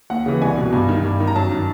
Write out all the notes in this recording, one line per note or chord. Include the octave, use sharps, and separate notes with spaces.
D#2 F#5
C#3 E3
C2 G#5
B2
G2
D#3
G2
D#3
A#5
F#2 A5
D#3